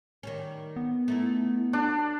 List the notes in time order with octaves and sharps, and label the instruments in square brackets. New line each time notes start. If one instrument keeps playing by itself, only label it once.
[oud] D#3 G3 C#4
[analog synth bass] B3
[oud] A3 D#4 E4
[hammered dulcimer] D4 [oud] F#4 A4